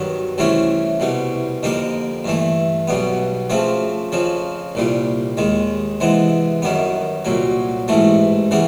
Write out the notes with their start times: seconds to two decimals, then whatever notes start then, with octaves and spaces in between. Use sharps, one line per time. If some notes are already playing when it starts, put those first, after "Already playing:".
Already playing: G2 D#3 F#3 B3
0.38 C2 C3 E3 A3 C#4
1.00 C2 B2 G3
1.63 F2 D3 G3 A#3 D#4
2.24 G2 E3 A3
2.87 B1 B2 G3 B3
3.50 C#3 F3 A3 C4
4.12 F2 C#3 F3
4.75 C2 A#2 G3
5.37 D#2 D#3 G#3
6.00 C3 E3 G#3 B3
6.62 F#2 D#3 G3 B3
7.25 C2 A#2 F#3
7.88 A1 G#2 E3 A3
8.51 C#3 E3 G3 B3